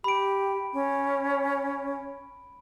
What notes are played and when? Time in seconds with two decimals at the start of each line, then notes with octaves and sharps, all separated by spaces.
0.04 G4 B5 D7
0.73 C#4